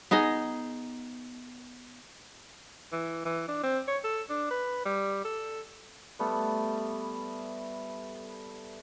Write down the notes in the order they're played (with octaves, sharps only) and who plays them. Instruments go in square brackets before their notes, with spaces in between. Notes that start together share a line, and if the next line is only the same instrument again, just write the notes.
[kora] B3 D#4 G#4 D#5
[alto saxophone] E3
E3
D4
C4
C#5
A4
D4
B4
G3
A4
[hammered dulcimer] G3 A3 B3 A4